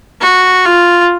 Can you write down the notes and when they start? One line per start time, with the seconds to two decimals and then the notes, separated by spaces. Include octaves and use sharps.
0.21 F#4
0.65 F4